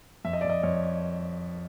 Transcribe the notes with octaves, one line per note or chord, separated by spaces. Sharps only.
F2 E5
D#5
D5
F2 D#5
F2 C#5